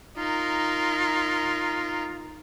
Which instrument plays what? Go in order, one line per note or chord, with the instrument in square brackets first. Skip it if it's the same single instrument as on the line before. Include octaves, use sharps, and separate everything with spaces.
[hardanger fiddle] D#4 A#4 [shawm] F4